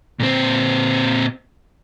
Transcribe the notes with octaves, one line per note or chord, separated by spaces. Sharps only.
A#2 C4